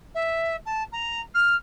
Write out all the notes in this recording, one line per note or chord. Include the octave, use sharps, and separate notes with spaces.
E5
A5
A#5
F6